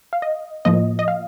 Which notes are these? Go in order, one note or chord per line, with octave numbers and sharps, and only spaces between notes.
F5
D#5
A2 F3 A#3 D#5
D#5
F5